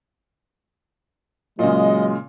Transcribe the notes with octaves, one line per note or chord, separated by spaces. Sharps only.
A#2 C#3 F#3 G#3 D#5